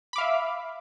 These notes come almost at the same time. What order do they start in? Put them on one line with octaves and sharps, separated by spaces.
B5 D6 F5 E5